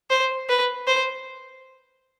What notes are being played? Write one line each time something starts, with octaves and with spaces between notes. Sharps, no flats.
C5
B4
C5